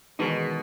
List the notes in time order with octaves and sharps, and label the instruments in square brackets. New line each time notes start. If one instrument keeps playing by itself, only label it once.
[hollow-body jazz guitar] E2 D#3 G#3 D#4 [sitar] B2